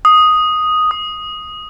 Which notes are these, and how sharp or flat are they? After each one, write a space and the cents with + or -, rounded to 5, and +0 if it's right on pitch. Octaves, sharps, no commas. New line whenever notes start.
D#6 +0
D#6 +0